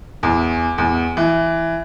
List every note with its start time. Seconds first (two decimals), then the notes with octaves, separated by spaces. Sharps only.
0.23 E2
0.78 E2
1.17 E3